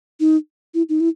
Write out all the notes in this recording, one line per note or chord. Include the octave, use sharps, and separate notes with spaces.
D#4
E4
D#4
E4